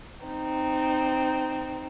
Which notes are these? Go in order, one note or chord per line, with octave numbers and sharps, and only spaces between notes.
C4 D#4